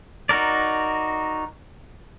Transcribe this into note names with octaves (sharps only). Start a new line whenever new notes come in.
D#4 F#4 A#4 D5